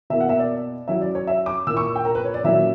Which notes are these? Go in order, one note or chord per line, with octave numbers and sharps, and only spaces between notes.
B2 A#3 E4 E5
F#5
E5
D5
F#3 C#4 E4 E5
D5
C#5
E5
D6
A#2 A#3 E4 E6
C#6
G5
A#4
B4
C#5
D5
A#2 F#3 C#4 E4 E5